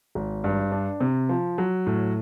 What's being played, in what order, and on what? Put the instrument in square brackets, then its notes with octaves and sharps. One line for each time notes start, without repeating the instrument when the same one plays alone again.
[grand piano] G#1
G2
D4
C3
F3
F#3
A2